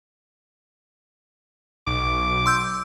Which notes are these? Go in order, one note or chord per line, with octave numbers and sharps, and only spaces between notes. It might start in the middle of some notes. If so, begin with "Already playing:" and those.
B1 D6
C6 E6 G6